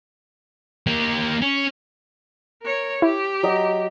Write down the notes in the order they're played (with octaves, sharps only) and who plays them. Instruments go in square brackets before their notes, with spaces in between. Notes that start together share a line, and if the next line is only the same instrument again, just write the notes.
[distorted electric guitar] A#3 G4
C#4
[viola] A#4 C#5
[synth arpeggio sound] E4 [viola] G4
[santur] F#3 D#5